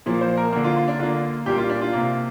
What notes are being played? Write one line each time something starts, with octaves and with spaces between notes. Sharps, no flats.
A#2 F3 A#3
C5
A#4
D3 A#3
F4
F4
D4
D3 A#3 F4
A#2 G3 A#3 G4
F4
D4
F4
C3 A#3